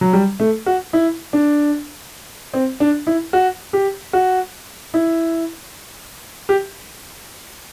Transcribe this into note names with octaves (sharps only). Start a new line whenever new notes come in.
F#3
G3
A3
F#4
E4
D4
C4
D4
E4
F#4
G4
F#4
E4
G4